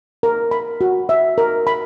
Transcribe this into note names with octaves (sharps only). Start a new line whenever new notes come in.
A#4
B5
F#4
E5
A#4
B5